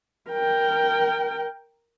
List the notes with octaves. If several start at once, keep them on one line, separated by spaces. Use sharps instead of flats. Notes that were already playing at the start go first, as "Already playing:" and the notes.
A#4 G5